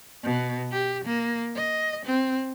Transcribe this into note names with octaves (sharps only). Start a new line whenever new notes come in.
B2
G4
A#3
D#5
C4